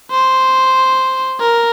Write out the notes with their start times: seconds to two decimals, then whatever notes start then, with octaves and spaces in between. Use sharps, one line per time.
0.11 C5
1.40 A#4